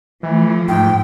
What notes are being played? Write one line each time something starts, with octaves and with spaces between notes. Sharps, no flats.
E3 F3 A3
G#2 G5